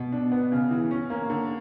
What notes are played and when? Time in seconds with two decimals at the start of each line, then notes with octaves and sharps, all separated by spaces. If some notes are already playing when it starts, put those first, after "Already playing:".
Already playing: B2
0.12 D4
0.32 B3
0.52 C#3
0.71 E3
0.91 C#4
1.10 A#3
1.30 D3